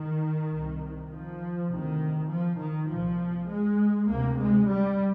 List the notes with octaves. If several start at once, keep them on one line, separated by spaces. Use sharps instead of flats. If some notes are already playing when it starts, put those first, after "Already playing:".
Already playing: D#3
C2 C3
F3
D2 C3 D#3
F3
D#3
C2 A#2 F3
G#3
D2 C3 A#3
G#3
G3